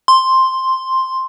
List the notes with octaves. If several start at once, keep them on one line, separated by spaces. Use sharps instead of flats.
C6